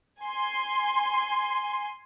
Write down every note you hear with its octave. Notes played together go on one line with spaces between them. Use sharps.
G#5 C6